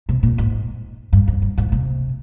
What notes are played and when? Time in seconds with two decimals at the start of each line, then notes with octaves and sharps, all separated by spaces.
0.09 C3
0.23 A#2
0.38 G#2
1.13 G2
1.28 F2
1.42 G2
1.58 G#2
1.72 C3